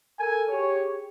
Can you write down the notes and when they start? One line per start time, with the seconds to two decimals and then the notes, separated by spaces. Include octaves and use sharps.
0.20 A4 A#4 G#5
0.49 G4 G#4 C#5